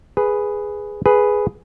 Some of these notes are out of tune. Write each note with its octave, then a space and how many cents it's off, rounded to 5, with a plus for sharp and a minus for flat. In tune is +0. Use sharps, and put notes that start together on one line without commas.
G#4 +0 B4 +0
G#4 +5 B4 +0